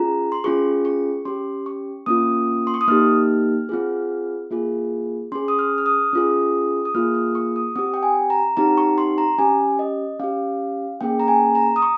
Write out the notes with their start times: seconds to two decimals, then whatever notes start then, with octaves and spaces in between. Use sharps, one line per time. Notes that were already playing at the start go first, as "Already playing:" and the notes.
Already playing: C#4 F4 G#4 A#5
0.32 C6
0.44 C#4 F4 G#4 C#6
0.85 C#6
1.25 C#4 G4 C6
1.66 C#6
2.06 A#3 C#4 F4 D#6
2.67 C6
2.74 C#6
2.81 D#6
2.88 A#3 D#4 G4 F6
3.69 C4 F4 G#4
4.51 A#3 F4 G#4
5.32 C#4 G#4 C6
5.48 D#6
5.59 F6
5.78 F6
5.86 D#6
6.13 C#4 F4 G#4
6.85 D#6
6.95 A#3 F4 G#4 F6
7.14 D#6
7.35 C#6
7.56 D#6
7.76 C4 G4 D#6
7.94 G5
8.03 G#5
8.30 A#5
8.57 C4 D#4 G4 A#5
8.78 C#6
8.98 C6
9.18 A#5
9.38 C#4 G4 G#5
9.79 D#5
10.19 C#4 G4 F5
11.01 A#3 C#4 G#4 G5
11.20 A#5
11.28 G#5
11.55 A#5
11.76 D#6
11.82 C#6